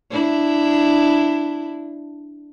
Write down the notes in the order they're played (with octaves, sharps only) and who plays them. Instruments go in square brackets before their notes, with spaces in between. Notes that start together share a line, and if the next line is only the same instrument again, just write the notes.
[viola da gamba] D4 E4